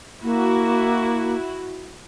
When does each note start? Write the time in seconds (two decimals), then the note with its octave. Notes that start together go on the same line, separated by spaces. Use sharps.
0.23 A#3 E4 F#4